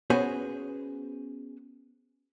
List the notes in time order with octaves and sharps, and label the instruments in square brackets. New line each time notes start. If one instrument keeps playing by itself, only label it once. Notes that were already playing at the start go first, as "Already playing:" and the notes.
[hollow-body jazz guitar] B3 C#4 F#4 G#4 B4 C5